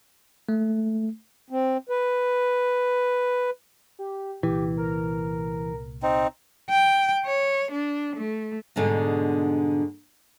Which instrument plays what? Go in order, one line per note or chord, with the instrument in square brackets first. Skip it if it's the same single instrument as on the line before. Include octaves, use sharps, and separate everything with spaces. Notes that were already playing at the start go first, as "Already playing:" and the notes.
[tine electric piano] A3
[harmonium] C4
B4
[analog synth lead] G4
[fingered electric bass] C2 A#2 [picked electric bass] E3 [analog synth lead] G4
[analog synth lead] A#4
[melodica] C4 D#4
[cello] G5
C#5
D4
A3
[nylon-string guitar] G#2 B2 D3 G3 G#3